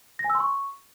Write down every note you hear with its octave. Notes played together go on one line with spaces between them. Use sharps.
A#6
G#5
E6
C6
C#6